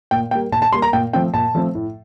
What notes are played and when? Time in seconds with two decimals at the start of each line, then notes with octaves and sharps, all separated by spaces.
0.11 A#2 G5
0.31 G3 A#3 G5
0.52 A#2 A5
0.62 A5
0.73 G3 A#3 C6
0.82 A#5
0.93 A#2 G5
1.13 F3 A3 C4 G5
1.34 A#2 A5
1.55 F3 A3 C4
1.75 A2